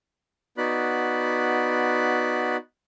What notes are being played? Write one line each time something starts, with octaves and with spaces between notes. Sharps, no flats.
B3 D#4 F#4 D5 B5 F#6